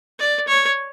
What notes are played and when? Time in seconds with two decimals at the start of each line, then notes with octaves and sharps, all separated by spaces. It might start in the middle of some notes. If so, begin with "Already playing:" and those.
0.19 D5
0.48 C#5